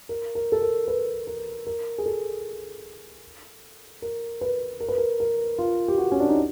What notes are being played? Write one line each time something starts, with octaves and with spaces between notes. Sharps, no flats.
A#4
A#4
A4
A#4
B4
A#4
A#4
G#4
A4
A#4
B4
A#4
B4
A#4
A#4
F4
G4
F#4
C#4
D4
D#4